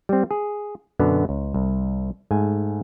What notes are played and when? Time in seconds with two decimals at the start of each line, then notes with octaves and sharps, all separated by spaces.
0.09 G3 C4
0.31 G#4
0.99 F#2 B2 D3 B3
1.29 C#2
1.54 C2
2.31 G#2 A3 G#5